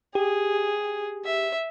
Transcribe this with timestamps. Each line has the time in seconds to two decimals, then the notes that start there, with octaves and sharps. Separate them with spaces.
0.15 G4 G#4
1.25 E5